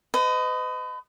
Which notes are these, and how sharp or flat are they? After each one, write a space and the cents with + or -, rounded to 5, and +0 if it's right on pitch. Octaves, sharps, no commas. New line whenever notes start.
B4 +40 D#5 +0